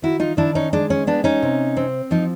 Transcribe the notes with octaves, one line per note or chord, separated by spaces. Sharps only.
D#3 E4 F#4
D#4 F4
D#3 D4 E4
C#4 D#4
G#3 D4
C#4
B3 D4
C#4 D#4
C3
C4
F3 D#4 F4